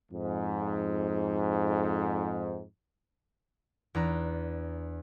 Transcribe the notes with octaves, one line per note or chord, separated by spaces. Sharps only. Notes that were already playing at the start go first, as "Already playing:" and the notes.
F2 G#2
E2 D4 A#5